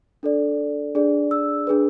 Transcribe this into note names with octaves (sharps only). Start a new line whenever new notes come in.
D4 A4 D5
D4 G#4 D5
E6
D4 G#4 B4